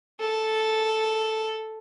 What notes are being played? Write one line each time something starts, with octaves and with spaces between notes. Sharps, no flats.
A4